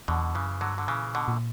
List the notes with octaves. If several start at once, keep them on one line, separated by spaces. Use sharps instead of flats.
E2 B2 D3
F#2 C#3 E3
G2 D3 F#3
D3
A#2 C#3 E3
B2 D3
A#2